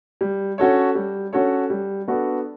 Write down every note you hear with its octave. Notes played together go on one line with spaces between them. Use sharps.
G3
C#4 F#4 A4 C#5
G3
C#4 F#4 A4 C#5
G3
B3 D4 F#4 A4